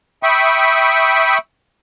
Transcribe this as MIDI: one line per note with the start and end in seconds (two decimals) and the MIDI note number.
0.23 1.38 76
0.23 1.38 79
0.23 1.38 83
0.23 1.38 85
0.23 1.38 87